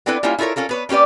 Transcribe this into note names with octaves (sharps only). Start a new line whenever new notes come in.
B3 C4 D4 E4 A4 B4
G3 A#3 C#4 E4 F4
E4 F4 A4 A#4 C#5
C#4 F4 A4 A#4
B3 B4 C#5
A#3 C#4 G4 B4 D5